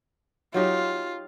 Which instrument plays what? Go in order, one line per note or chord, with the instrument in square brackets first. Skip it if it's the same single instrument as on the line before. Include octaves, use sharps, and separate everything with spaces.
[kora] F#3 D#4 G4 [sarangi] F4